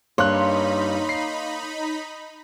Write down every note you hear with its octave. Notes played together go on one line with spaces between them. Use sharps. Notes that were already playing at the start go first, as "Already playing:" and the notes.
G2 A#3 D#4 C#5 B5 C6 F#6
C7